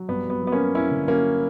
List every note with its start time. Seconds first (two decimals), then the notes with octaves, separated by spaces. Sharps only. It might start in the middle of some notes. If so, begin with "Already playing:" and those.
Already playing: F#3
0.09 G2 B3
0.25 F#3 B3
0.42 F#3
0.47 B3
0.52 A#3 C#4
0.58 F#3
0.75 G2 C#4 E4
0.91 D3
1.08 F#3 A#3 C#4